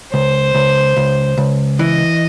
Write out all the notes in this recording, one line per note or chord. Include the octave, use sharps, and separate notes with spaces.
C#2 C5
C#2
C#2
C#2
E3 D#5